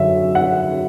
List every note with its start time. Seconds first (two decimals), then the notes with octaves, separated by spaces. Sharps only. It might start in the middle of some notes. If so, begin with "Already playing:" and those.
Already playing: F#2 D3 F#3 C#4 E5
0.35 F#5